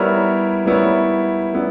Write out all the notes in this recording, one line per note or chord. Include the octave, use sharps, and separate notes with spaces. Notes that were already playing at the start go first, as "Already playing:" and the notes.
Already playing: G3 B3 E4 A#4 C#5
G3 B3 E4 A#4 C#5
G3 B3 E4